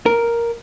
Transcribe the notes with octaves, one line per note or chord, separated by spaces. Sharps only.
A#4